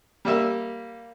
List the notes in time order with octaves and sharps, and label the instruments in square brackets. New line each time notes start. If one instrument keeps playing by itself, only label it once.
[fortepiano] G3 A#3 E5